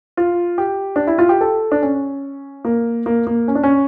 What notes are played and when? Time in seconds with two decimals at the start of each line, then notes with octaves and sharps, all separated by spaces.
0.17 F4
0.58 G4
0.96 D4
1.07 E4
1.18 F4
1.29 G4
1.41 A4
1.72 D4
1.82 C#4
2.65 A#3
3.06 A#3
3.27 A#3
3.48 C#4
3.55 D4
3.63 C#4